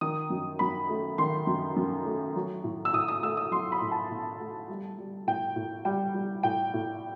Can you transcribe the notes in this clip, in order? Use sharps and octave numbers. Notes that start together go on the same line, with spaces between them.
D#3 D#6
F#2
F#2 B5
A3
D#3 C6
F#2
F#2
A3
F#3
A2
E6
A2 D#6
D#6
A3 E6
D#6
F#3 C6
B5
A2
A5
A2
A3
G3
G3
A2 G5
A2
G3 G5
G3
A2 G5
A2